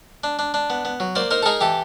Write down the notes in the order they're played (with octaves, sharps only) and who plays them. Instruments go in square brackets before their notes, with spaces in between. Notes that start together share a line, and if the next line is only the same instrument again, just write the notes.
[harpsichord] D4
D4
D4
B3
B3
F#3
A#3 C5 D5
D#4 A#4 C5
A4
D#4 G#4 A#4
E3 G4 A4